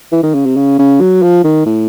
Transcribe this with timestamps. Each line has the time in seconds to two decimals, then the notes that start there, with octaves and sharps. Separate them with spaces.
0.12 E3
0.23 D#3
0.34 C#3
0.46 C3
0.56 C#3
0.79 C#3
1.01 F#3
1.22 F3
1.44 D#3
1.66 A2